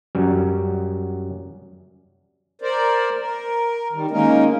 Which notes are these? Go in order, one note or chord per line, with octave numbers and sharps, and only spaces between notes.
F#2 F#3 G3 C#4
A#4 C5 D5
A#4
D#3 G3
G#3 A#3 C#4 D#4 A#4